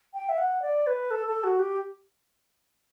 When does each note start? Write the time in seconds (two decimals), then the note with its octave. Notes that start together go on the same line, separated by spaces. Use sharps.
0.14 G5
0.29 E5
0.38 F#5
0.62 D5
0.87 B4
1.11 A4
1.27 A4
1.44 F#4
1.59 G4